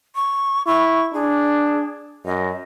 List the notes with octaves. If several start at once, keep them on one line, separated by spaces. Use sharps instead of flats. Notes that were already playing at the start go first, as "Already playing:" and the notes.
C#6
E4 C#6
D4 G#4
F#2 D#5